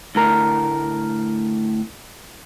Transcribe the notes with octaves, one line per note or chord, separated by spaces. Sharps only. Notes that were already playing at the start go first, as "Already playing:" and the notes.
D2 A2 A#4